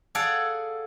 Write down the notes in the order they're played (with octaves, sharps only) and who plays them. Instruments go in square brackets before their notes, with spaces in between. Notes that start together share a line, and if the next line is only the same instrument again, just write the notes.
[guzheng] G#4 A4 D5 F5 F#5